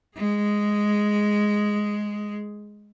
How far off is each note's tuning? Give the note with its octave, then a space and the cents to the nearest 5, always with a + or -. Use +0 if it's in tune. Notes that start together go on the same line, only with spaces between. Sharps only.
G#3 +0 G#4 +0